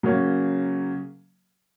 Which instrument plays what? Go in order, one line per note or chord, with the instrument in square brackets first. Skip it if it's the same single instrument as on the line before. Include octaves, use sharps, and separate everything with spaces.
[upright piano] C#3 F#3 A#3 C#4